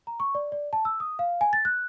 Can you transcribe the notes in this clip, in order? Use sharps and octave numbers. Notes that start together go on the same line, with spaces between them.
A#5
C#6
D5
D5
A5
E6
D#6
F5
G#5
A6
F#6